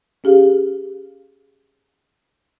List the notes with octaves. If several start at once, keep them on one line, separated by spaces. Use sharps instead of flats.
C#4 G4 G#4 F5